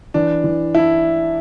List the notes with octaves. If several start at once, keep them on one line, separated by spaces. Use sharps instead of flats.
E3 D4
E3
D4 E4